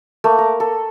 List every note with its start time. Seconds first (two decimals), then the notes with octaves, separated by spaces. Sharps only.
0.24 A3 A#3
0.39 A#4
0.60 A4